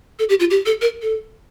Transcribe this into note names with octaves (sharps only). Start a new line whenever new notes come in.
A4
G4
F4
G4
A4
A#4
A4